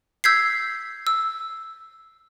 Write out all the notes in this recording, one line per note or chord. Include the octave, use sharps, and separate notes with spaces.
E6 G6 G#6 B6 C7
E6